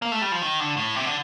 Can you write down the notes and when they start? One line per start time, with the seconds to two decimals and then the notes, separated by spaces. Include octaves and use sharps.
0.02 A#3
0.12 A3
0.22 G3
0.32 F3
0.42 D#3
0.60 D3
0.77 A2
0.95 C3
1.05 D3